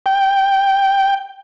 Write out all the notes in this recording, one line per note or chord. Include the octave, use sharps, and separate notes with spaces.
G5